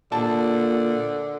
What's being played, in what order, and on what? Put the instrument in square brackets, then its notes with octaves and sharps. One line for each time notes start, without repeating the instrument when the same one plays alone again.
[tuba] A#2 [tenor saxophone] D3 [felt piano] A5